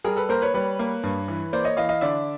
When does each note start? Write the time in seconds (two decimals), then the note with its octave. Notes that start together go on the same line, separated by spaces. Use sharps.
0.04 G3 G#4 A#4
0.17 A4 B4
0.29 A#3 A#4 C5
0.42 B4 C#5
0.54 G3 B4 C#5
0.79 A#3
1.03 G2
1.28 E3
1.53 A#3 C5 D5
1.64 C#5 D#5
1.77 E3 D#5 F5
1.89 D#5 F5
2.01 D3 D5 E5